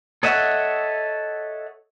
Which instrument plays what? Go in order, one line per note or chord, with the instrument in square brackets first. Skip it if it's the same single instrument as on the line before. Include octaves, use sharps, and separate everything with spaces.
[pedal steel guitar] A4 C#5 D#5 E5 F#5